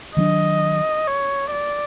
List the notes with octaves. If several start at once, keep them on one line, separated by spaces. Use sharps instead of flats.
D#3 F#3 B3 D4 D#5
C#5
D5